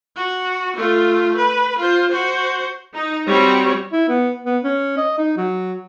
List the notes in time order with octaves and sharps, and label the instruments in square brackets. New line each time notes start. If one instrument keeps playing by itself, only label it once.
[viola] F#4
A3 F4
B4
F4 C5
F#4 C5
[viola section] D#4
G3 C4 F#4 C#5
[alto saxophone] E4
B3
B3
C#4
D#5
D#4
F#3